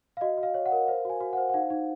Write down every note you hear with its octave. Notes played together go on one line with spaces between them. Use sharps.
F5
F#4 D#5
F#4
F5
C#5
F#5
A#4
C5 F5
F#4 G#5
F#4
C5 F#5
F#5
D#4 F5
D#4